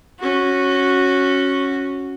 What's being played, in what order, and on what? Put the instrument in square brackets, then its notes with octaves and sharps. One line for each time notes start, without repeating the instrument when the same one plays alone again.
[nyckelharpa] C#4 F#4